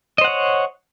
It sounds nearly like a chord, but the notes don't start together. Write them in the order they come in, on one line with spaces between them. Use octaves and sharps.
D#5 C5 F#5 C#5